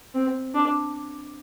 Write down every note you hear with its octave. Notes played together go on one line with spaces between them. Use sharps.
C4
D4